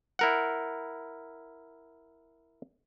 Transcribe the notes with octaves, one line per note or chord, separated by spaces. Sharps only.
E4 A#4 F#5